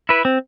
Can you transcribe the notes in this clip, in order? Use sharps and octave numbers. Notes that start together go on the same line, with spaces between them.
E4 B4
C4